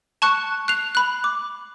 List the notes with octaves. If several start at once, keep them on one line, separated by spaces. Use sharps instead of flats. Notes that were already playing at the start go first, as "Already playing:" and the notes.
A5 C#6 F#6 C#7
F#6 C7 F7
B5 F#6
D6